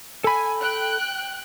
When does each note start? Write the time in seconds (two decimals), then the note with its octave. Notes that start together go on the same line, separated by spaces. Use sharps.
0.24 A4 G#5 B5
0.58 G5 F#6